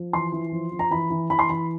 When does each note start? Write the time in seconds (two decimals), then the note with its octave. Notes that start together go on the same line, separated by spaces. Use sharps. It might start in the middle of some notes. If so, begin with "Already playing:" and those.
Already playing: F3
0.13 E3 C6
0.32 E3
0.52 F3
0.72 F3
0.79 A#5
0.91 E3 B5
1.10 E3
1.30 E3 B5
1.39 C6
1.49 E3 B5